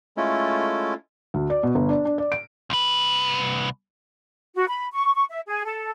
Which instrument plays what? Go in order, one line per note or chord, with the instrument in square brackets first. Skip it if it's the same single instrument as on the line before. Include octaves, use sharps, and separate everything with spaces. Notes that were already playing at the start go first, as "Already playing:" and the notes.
[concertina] G#3 A3 C#4 E4 F4 A4
[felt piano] D2
D5
B2
G1
D4
D4
D5
D7
[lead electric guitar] C2 B4
[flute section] F#4
B5
C#6
C#6
E5
G#4
A4